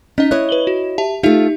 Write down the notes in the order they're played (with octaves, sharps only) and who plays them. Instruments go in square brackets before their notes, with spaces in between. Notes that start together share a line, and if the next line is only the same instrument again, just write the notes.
[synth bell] C#4 D#5 B6 [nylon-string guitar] D#4
[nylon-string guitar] E4 C#5 D#5 [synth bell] F#6
[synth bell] B4 F#7 G7
F#4
G4 E5 A5
[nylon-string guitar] A3 F4 [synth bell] D#4 G4 E5